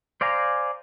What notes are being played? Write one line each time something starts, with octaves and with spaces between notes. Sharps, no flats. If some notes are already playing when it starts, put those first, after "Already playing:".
C5 D5 F5 G#5 A#5